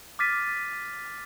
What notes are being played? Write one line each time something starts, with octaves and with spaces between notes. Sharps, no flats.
D6 F6 A6 B6 D#7